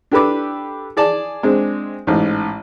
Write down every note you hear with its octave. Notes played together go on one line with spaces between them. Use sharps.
D4 G4 A4 B4 D6
G#4 D5 A5
G#3 C4 D4
A1 G#2